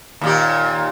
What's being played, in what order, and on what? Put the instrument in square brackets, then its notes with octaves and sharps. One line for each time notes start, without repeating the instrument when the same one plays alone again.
[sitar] D#2 A#2 G4